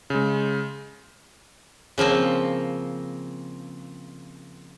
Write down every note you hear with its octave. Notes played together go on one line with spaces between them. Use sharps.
C#3 G#3
C#3 F3 A#3 C4